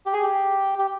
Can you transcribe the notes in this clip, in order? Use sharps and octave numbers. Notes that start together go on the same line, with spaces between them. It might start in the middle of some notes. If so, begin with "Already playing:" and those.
G4
G#4
G4
G4